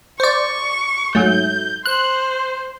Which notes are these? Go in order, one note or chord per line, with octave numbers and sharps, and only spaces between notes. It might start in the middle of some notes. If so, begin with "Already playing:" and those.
C5 D5 C#6
G#2 F#3 A3 G6
C5 F#6